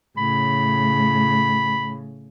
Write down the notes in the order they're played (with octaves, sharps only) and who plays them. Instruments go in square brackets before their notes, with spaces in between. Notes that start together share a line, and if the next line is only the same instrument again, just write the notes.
[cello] A2 C#3 [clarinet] B5